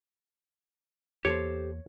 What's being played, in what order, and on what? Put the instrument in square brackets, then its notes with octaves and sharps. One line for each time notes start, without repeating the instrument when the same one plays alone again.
[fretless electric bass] E2 A#3 [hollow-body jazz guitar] G4 A4 C5 [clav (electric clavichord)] C#5